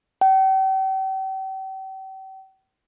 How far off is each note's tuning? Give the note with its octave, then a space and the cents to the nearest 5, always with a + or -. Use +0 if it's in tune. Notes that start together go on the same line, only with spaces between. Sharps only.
G5 -40